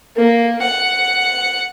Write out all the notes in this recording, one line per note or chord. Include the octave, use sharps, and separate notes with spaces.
A#3
F#5